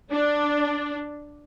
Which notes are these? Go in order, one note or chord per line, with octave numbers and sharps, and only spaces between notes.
D4